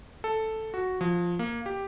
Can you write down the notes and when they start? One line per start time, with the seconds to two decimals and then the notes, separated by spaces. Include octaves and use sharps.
0.24 A4
0.74 F#4
1.01 F3
1.39 A#3
1.66 G4